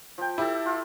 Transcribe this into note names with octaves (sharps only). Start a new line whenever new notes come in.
F3 G5
E4 G4 A4
F4